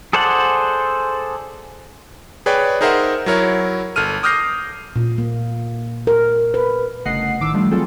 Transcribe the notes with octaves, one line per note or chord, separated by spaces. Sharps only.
G#4 A4 C5 D5 F#5
G#4 B4 C#5 D5 G5
D#4 G#4 A#4 C5 E5 F#5
F#3 E4 A#4 C#5
G1 A4 F6 D#7
D6 D#6 F6 G6 A#6 C7
A#2
A#3
A#4
B4
G1 C#3 A3 D#5 F#5 C7
A1 A2 D#3 D6 E6
D#3 F3 G3 A3 D4
E3 F#3 C4 F4 G#4 A4